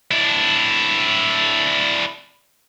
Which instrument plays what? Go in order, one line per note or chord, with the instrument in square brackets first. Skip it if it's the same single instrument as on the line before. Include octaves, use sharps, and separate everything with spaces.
[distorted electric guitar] D4 E4